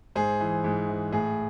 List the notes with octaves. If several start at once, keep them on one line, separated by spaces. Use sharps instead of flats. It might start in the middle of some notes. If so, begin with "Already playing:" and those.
G#2 G#4 C5
E3
G#2
E3
A2 G#4